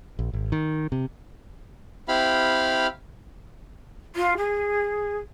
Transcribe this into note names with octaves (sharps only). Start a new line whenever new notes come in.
A#1
G#1
D#3
C3
C4 E4 G4 F5 B5 F6
F4
G#4